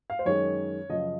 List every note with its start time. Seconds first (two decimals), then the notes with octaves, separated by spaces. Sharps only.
0.10 F5
0.19 C5
0.26 F#2 D#3 G#3 C#5
0.89 F#2 C#3 F3 D#5